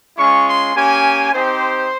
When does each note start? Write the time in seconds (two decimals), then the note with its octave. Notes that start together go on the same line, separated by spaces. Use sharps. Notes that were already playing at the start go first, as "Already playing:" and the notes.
0.17 G#3 C#4 F4 C#6
0.47 C6
0.74 A#3 C#4 G4 G#5
1.33 C4 D#4 G4 C5